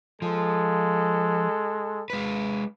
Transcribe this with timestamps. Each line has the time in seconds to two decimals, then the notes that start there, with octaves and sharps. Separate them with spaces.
0.22 F3 G#3 A4
2.10 G#3 B4